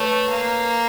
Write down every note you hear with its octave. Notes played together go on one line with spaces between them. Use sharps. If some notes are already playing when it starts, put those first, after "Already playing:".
Already playing: A3 B4 C#5
A#3